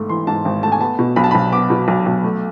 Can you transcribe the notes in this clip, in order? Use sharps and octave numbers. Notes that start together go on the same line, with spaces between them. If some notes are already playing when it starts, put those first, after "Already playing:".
Already playing: G#1 G#2 A3
E3 C6
G#2 A5
G#1
A3 A5
G#5
B3 A5
B2
B1 B5
A5
B5
B1
B3 D6
B2
B1
B1
A3